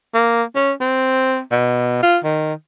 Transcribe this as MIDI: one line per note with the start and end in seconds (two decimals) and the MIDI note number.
0.14 0.43 58
0.55 0.72 61
0.80 1.40 60
1.51 1.99 47
2.03 2.18 65
2.24 2.53 51